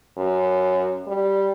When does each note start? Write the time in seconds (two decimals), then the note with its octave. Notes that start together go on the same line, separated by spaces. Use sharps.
0.18 F#2
1.07 G3